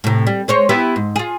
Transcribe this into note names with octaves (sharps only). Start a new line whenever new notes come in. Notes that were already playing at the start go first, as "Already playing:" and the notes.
A2 C3
G3
G#3 C5 C#5
B3 E4 G4
G#2
F4 G#4